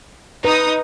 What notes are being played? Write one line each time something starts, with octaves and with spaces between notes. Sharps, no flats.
D#4 B4 D#6